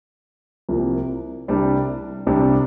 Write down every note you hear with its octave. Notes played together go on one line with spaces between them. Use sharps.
C2 C3 F3 A#3
C2 C3 G3 D4
C2 C3 G3 D4